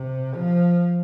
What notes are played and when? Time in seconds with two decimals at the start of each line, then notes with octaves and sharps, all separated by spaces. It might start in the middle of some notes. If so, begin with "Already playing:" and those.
Already playing: C3
0.35 F3